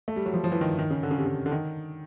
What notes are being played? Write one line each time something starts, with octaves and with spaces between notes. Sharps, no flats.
A3
G3
F#3
F3
F3
E3
D#3
D#3
C#3
D3
C#3
C3
C#3
D3
D#3